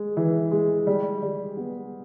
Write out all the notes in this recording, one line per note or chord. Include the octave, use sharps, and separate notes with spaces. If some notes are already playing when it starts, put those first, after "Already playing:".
Already playing: G#3
E3
G#3
G3
G3
B3